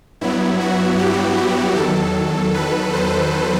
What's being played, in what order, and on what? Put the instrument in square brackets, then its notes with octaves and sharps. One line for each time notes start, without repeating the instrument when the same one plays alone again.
[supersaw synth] G2 F#3 B3 E4
F#4
G4
G4
E2 D#3 F#3 A4
B4
C5